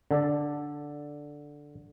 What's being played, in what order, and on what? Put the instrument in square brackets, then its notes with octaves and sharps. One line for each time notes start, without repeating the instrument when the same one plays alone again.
[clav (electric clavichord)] D3 A4 D5